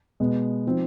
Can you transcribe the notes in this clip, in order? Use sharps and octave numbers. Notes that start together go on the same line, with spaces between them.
B2 G#3 B3
F3 C4 D#4